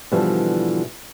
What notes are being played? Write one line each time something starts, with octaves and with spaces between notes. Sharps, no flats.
B2 D3 E3 F3 G3